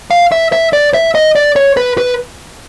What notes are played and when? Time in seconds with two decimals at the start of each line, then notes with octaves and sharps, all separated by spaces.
0.11 F5
0.32 E5
0.52 E5
0.73 D5
0.94 E5
1.15 D#5
1.35 D5
1.56 C#5
1.77 B4
1.98 B4